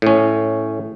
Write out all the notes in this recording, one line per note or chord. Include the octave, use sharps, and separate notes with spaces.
A2 C#4